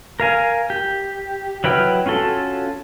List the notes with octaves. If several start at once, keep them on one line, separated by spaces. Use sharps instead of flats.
A#4 F5 G#5
G4
F#3 E4 B4 G5 F6
C#4 F4 F#4 A4